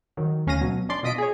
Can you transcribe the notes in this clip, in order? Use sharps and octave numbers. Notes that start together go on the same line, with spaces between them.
D#3 F#3
D2 C#4 F5 A#6 D#7
B2 F#3
C#4 D4 D5 C6
B2 F4 D#5 D#6 B6 D7
G#4 C#5